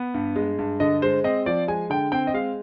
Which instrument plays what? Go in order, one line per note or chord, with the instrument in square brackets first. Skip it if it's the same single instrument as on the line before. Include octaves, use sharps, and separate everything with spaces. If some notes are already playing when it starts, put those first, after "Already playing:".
Already playing: [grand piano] B3
G2
G#3
G2
D3 D#5
G#3 C5
C4 D#5
F3 D5
G#3 G#5
D3 G5
C4 G5
D#5
G#3 F5